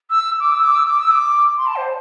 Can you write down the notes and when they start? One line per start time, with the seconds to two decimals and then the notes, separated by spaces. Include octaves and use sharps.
0.10 E6
0.40 D6
0.51 E6
0.63 D6
0.75 E6
0.86 D6
0.99 E6
1.11 D6
1.57 C6
1.66 A5
1.76 C5